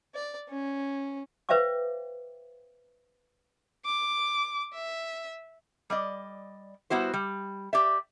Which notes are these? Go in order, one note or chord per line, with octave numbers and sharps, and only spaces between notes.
D5
C#4
B4 C5 E5 F5 G5 D6
D6
E5
G3 D5 D#5
G3 B3 E4 F#4 C5
G3
G4 D5 E5